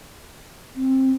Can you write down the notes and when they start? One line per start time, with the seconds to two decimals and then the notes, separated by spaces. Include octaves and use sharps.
0.76 C4